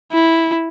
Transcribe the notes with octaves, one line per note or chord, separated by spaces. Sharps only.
E4